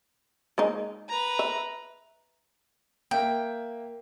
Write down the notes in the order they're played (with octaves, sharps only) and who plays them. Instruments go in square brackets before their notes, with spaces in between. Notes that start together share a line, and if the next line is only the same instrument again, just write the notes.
[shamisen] G#3 A#3 D#4
[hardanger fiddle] B4 A#5
[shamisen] E5
[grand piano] A#3 E5 [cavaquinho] G5